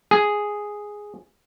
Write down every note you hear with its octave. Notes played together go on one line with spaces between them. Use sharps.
G#4